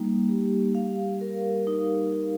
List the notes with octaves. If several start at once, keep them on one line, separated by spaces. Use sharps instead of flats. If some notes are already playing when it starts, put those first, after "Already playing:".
Already playing: G3 A#3 D#4
G4
F5
A#4
D#4
D#4